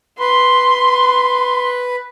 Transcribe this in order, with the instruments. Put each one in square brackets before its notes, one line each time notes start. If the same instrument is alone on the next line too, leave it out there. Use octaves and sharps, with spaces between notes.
[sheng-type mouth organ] B4 [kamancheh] C6